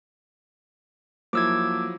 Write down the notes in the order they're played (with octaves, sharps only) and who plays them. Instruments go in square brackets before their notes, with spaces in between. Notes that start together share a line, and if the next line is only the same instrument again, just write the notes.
[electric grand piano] F3 F#3 E4 [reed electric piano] A#3 [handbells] D6 E6 G#6